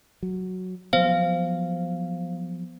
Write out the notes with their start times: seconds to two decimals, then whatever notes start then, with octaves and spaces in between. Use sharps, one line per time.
0.23 F#3
0.93 F3 F#3 B3 C5 F5